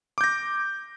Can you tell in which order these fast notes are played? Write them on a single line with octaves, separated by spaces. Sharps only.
D6 G6 A#6